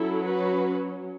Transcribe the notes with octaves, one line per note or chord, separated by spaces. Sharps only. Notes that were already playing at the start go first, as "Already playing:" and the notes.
Already playing: F#3 C#4 E4 A4
F#4 B4